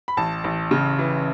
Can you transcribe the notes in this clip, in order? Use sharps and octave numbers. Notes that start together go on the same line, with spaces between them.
B5
A1 A5
A1
C#3
E3